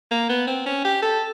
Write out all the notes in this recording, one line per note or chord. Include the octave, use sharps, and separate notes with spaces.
A#3
B3
C4
C#4
G4
A4